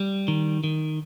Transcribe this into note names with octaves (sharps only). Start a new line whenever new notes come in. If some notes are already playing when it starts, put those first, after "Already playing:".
Already playing: G3
D#3
D#3